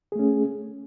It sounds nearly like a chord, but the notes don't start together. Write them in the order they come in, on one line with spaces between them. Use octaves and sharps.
G#4 A3 C#4